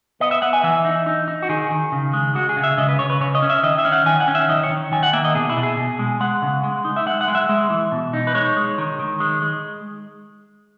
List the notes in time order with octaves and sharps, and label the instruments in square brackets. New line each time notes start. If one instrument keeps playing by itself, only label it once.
[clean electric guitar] B3 D#5
E5
B3 F#5
G#5
E3 E5
D#4
D#4
D#4
F#4
D#3 G#4
D#3
C#3
G#3
G#3 F#4
G#4
C#3
E5
C#3 D#5
B4
C#3 C#5
B4
C#3 C#5
D#5
C#4
E5
D#3 D#5
E5
C#4
F#5
D#3 G#5
F#5
C#4
E5
D#3 D#5
C#5
D#3
D#3 G#5
F#5
A#3 E5
D#5
B2 G#4
E4
B2
G#4
B2
G#3
G#3 F#5
C#3
G#3
D#4
E5
G#3 F#5
F#5
G#3
E5
G#3
E3
B2
D#4
B4
G#3 C#5
G#3
D#3
D#3
G#3
G#3